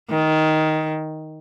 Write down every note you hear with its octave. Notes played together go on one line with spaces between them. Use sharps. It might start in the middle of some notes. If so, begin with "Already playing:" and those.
D#3